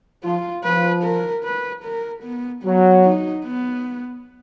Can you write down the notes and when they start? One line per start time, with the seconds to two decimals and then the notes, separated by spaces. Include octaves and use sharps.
0.23 F3 F4
0.64 F3 B4
1.03 A#4
1.44 B4
1.84 A#4
2.24 B3
2.63 F#3 B3
3.04 D#4
3.44 B3